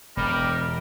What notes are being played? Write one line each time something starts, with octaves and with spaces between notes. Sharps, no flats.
E1 G3 A#4